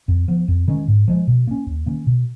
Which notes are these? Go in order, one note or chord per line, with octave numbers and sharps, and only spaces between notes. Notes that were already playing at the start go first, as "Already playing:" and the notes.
F2
F3 B3
F2
D#3 G#3 C#4
G#2
F3 G#3
B2
A#3 C#4
D#2
D#3 A#3 C#4
B2